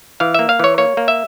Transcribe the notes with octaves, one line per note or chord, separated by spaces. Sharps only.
E3 F5
A#3 E5
F5
E3 C#5
A#3 C#5
A#3
E5